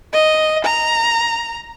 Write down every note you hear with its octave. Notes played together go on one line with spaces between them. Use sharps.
D#5
A#5